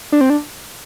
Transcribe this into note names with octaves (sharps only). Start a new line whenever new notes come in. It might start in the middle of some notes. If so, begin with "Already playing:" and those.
D4
C4
D4